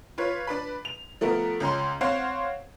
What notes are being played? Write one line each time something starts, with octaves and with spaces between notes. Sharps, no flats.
F4 B4 C#5
D4 B4 B5
F7
F3 A3 B3 A#4
C#2 C#4 A#5 C6
C4 C5 C#5 F5 F#5